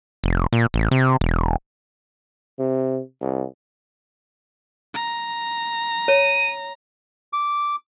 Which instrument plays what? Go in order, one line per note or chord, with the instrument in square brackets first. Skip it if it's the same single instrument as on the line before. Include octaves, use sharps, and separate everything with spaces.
[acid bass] F1
A#2
A1
C3
E1
[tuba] C3
C2
[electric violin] A#5
[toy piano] C#5 [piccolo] D#7
[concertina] D6